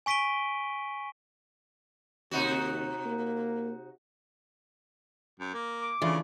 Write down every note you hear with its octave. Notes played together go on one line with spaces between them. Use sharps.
G#5 C#6 B6 D7 D#7 G7
D#2 C3 D#4 F#4
A#3
F#2
A#3
D6
C#3 E3 A3 D4 F4